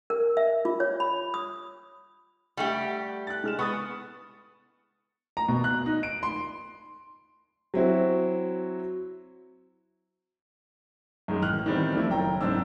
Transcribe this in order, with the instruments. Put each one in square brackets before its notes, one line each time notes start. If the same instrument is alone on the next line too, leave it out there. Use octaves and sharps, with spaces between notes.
[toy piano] A#4
E5
F4
C#5
B5
D#6
[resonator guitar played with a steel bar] G3 A3 G4 [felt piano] F#5
[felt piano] F#6 A6
G#3 F6 E7
[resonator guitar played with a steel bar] B3 [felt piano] C#6 D#6 A6
[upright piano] A#5
B2
F#6
D#4
D7
C6
F#3 C4 E4 F#4
[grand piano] F#2 D#3 G#3
A1 F6 F#6
D#3 E3 G3 B3 C4
F3 A3 D4 E4
F#1 D#2 G5 A#5
F#1 G#2 C4 D4 E6